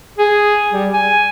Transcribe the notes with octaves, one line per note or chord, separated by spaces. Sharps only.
G#4
G3
G#5